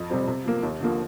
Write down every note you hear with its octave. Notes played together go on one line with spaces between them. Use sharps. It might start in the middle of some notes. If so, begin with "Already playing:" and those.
Already playing: F2
C3 G3 C4
C3
F3 A#3
D#2
D3 F3 A#3